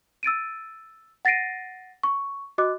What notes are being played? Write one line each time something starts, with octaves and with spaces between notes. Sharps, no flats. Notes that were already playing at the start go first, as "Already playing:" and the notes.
E6 A6 D7 D#7
F#5 A6 A#6 C7 D7 D#7
C#6
F#4 D#5 D6 F#6